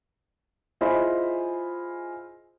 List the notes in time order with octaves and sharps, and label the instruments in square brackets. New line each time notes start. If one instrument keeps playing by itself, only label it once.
[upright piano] E4 F4 G#4 C5 D#5 B5